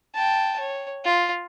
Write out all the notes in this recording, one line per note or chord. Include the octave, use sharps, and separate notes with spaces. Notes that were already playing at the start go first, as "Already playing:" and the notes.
G5 A5
C#5
F4